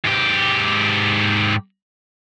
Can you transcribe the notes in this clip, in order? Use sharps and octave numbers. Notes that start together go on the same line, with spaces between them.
G#2 G4